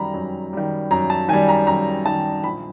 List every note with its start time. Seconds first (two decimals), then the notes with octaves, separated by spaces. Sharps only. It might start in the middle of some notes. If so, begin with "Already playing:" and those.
Already playing: F#2 D#3 G3 A#5 B5
0.14 F#2
0.53 D#3 G3
0.91 F#2 A#5
1.10 A5
1.29 D#3 G#5
1.33 G3
1.48 A#5
1.67 F#2 A#5
2.05 D#3 G3 A5
2.44 A#1 B5